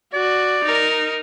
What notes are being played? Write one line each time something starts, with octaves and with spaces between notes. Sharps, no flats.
F#4 D5
D#4 A#4